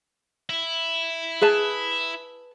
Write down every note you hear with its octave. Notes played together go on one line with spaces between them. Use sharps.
E4
G#4 B4 A5